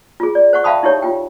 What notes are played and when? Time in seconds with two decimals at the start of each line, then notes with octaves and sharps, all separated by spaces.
0.20 F4 G#4
0.35 D5
0.53 C5 F#5 C#6
0.64 E5 F5 G5 A5 B5 D#6
0.83 D#4 E4 G4 C#5
1.02 F4 G5